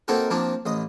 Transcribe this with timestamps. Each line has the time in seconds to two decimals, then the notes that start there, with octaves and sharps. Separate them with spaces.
0.08 A#3 C4 D#4 F#4 A4 A#4
0.30 F3 A#3 C4 D4
0.66 A1 D#5